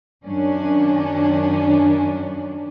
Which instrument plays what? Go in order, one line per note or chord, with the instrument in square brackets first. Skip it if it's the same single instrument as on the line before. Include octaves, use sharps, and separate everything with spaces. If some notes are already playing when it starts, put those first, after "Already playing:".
[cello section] F#2 D#3 C#4 D4